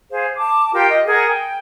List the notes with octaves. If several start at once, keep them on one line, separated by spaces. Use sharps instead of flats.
G#4 C5 F5
A5 D6
F4 G4 A#4 G5
D#5
G#4 A#4 F#5 G#5
G5